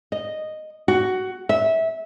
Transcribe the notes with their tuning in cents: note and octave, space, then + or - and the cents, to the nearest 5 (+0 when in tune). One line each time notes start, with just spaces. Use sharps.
D#5 -5
F#4 +10
E5 -20